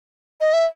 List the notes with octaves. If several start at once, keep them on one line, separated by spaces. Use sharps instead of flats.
D#5
E5